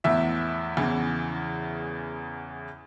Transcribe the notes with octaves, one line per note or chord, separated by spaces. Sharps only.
E2 A2 E4 E5
E2 C#3 E3